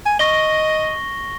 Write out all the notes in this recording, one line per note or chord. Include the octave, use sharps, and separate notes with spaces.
G#5
D#5 C#6 A#6 G7